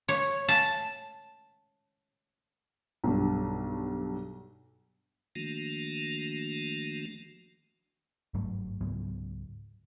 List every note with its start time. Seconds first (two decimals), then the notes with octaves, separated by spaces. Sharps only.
0.08 C#5
0.48 A5
3.04 B1 G2
5.36 D#3 F3 A3 A#3 D4 F#4
8.34 G1 G#2 F#3 A3
8.81 C#2 G#2 F#3 B3